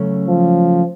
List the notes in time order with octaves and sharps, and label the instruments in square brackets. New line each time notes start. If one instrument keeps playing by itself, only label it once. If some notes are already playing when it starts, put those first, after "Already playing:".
Already playing: [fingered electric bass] C#3 F#3 A3 C#4
[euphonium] F3